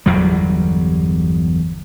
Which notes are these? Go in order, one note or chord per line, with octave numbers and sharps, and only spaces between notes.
G1 E2 F#3 G3